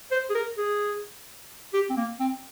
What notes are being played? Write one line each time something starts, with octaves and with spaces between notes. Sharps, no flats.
C5
G#4
A#4
G#4
G4
C4
A#3
C4